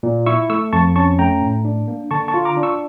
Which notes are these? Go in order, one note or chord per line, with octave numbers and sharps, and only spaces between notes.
A#2
E4 C#6 E6
A3 C#6 E6
F2 A5 C#6
C#4 A5 C#6
A3 G5 A#5
A2
D4
A#3
D3 A5 C#6
A5 C#6
F4
A#5 D6
D4
C#6 E6